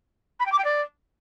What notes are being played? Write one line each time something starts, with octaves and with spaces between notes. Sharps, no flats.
B5
G5
D6
G5
D5